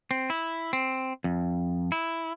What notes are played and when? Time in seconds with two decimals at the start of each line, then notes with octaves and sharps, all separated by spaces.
0.11 C4
0.30 E4
0.73 C4
1.24 F2
1.92 E4